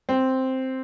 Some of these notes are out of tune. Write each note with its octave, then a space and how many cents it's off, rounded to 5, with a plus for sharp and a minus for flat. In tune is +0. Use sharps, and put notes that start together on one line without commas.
C4 +0 C5 +0